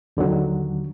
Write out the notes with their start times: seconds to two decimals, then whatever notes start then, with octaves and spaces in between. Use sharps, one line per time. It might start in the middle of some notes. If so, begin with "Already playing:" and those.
0.17 D#2 D3 D#3 F#3